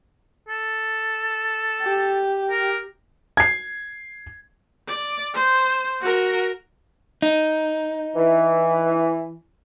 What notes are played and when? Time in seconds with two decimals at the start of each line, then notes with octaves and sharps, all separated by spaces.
0.49 A4
1.82 G4
2.50 A#4
3.37 G#6 C7
4.87 D5
5.34 C5
6.01 F#4 A#4
7.22 D#4
8.16 E3